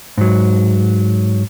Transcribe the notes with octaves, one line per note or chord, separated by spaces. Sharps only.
G#2 F#3